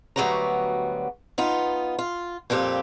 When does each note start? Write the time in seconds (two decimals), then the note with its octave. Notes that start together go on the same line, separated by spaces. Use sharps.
0.16 D2 F#3 G3 B3 F#4 A#5
1.38 B3 D#4 F4
1.99 F4
2.50 F2 A#2 G3 C4 G4